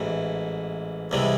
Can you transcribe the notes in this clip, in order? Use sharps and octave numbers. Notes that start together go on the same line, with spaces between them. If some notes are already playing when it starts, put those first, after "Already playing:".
Already playing: A1 G#2 E3
C2 C3 E3 G#3